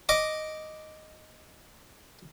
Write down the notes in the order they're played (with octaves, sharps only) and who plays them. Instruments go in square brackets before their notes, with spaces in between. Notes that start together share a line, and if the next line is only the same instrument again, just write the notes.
[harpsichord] D#5 D6 D#6